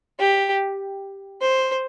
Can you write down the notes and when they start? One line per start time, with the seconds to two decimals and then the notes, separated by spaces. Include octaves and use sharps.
0.20 G4
1.41 C5